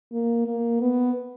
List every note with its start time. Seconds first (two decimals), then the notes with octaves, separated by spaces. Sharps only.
0.12 A#3
0.46 A#3
0.80 B3